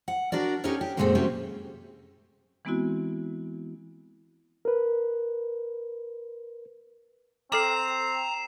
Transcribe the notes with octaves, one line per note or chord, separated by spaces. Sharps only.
F#5
D4 F#4 A#4 D5
C#4 D#4 G4 A4 A#4 C#5
G4
F#2 A#2 G#3 A3 B3 C4
C3 F#3 A3 C4 C#4 G4
E3 G#3 B3 C4 E4 F#4
A#4 B4
C4 A4 A#5 D6 C7 E7